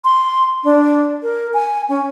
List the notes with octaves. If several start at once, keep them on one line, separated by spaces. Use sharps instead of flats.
C6
D4
A#4
G#5
C#4